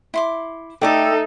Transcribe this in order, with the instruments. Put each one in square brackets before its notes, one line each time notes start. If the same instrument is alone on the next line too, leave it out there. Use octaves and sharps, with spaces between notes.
[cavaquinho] E4 C6 D6
[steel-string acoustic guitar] A3 [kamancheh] D#4 A4 [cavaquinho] G4 D5 D6